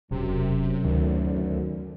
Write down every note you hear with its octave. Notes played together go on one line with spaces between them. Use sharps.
E1 F#2 C3
D2 D#3